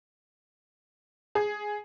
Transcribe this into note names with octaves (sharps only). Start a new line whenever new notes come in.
G#4